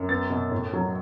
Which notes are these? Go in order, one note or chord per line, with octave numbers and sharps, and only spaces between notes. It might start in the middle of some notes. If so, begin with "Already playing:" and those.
Already playing: F#2
B3 A6
B2
A2
F#3